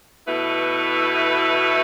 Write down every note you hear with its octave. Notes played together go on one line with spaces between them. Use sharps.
B2 A3 E4 B4